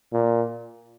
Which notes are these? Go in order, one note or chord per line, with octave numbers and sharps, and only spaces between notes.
A#2